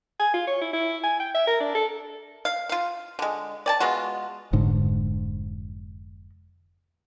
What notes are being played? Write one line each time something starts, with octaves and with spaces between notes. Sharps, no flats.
G#5
F4
C#5
E4
E4
G#5
G5
E5
A#4
D4
A4
F5
F4 F5
D3 G#3
D5 G#5 A5
G#3 B3 F4 F#4
F1 G#2 D3